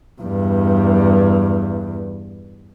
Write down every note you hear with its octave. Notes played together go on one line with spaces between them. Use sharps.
E2 G2